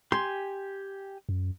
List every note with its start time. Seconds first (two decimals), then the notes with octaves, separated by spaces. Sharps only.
0.12 G4 G#5 C6
1.29 F#2